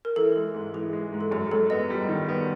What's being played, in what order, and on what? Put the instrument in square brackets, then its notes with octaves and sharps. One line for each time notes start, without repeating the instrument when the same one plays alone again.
[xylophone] A#4
[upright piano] E3 [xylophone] A4
[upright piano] G#3
G#2
[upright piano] E3 [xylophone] G#4
[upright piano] G#3
G#2
[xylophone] A4
[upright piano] F#2 [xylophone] G#4
[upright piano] F#2 [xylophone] A4
[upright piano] B3 [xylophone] D#5
[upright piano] G3
D#3
B3